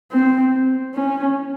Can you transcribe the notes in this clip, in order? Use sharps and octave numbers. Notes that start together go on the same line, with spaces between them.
C4
C#4